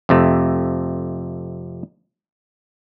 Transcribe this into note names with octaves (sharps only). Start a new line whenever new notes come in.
F2 C3 A3